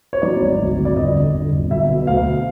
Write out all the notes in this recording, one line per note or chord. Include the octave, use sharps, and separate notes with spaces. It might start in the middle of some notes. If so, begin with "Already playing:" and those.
C#5
F#3 D5
G#1
D2
D2
D5
G1 D#5
D3
G1
G1
B1 E5
B2
D2 F5